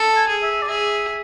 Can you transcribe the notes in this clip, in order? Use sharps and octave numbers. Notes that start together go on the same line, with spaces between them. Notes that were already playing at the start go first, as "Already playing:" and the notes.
Already playing: A4
G#5
G#4
E5
D5
G#4 E5